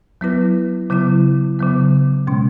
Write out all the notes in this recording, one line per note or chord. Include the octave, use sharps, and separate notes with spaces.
F#3 B3 E4 B4
C#3 F#3 B3 E4
C#3 F#3 B3
B2 G#3 C#4